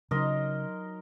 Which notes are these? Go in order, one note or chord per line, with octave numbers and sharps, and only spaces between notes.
C#3 F#3 D#4 A#4 D#5 C6